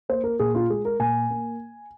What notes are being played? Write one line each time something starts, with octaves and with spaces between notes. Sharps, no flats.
A#3 C5
A#4
A#2 G#4
F4
G#3 G#4
A#4
A#2 G#5
A#3